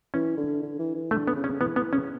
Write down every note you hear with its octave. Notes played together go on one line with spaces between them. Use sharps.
E3 C#4
D3
D3
E3
E3
D3 A3
B3
C#3
C#4
E3 B3
E3 B3
C#3 C#4